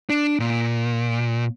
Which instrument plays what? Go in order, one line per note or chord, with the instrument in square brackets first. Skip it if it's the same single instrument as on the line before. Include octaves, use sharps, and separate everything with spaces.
[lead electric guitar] D4
A#2